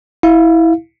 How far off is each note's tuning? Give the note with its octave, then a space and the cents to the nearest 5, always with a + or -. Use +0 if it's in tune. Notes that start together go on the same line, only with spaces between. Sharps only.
E4 -10 F5 +0